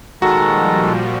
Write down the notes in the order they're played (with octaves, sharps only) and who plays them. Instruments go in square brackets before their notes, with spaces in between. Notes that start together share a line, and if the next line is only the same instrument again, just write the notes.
[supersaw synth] A#2 F3 G3 [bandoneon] D#3 G#3 A4 [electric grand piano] F#4 [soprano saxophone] A#5